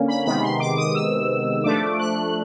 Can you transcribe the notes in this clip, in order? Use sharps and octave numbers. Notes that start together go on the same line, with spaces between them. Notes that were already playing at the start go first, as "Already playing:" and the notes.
Already playing: D3 A#3 C#4
B5
C3 D#3 G#3 B3 B5
C6
D6
D#6
E6
F3 A3 D4 D6
F#6